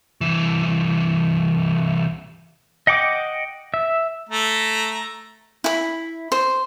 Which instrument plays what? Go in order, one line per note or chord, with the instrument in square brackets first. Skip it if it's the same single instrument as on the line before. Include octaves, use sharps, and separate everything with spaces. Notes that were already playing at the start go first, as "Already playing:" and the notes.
[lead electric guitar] C2 E3
[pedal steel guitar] D#5 F#5 G5 D6 D#6
E5
[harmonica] A3 A#5
[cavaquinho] E4 B5
C5